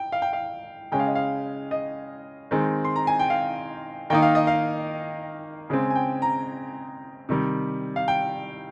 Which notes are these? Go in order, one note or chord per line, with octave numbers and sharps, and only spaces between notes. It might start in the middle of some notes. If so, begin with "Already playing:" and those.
Already playing: G5
F5
G5
F5
C#3 G#3 C#4 G5
F5
D#5
F5
D#5
D#3 G#3 C4
C6
A#5
G#5
G5
F5
D#3 A#3 D#4 G5
F5
D#5
F5
C#3 G#3 C4
G#5
G5
A#5
C3 D#3 G3
F5
G5